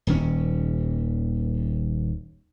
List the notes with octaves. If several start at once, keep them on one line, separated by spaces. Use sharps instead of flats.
D#1 D#2 C#4